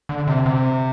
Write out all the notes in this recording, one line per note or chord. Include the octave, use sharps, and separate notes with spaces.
D3
C3
C3